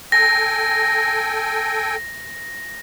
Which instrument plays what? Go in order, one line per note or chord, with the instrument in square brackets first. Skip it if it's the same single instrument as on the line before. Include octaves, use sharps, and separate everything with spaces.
[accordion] A4 G5 G#5 [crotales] A#6